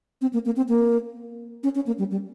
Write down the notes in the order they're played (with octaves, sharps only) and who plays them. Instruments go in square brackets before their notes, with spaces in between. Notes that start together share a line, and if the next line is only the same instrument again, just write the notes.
[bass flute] C4
A#3
A#3
C4
A#3
C#4
C#4
A#3
G3
G3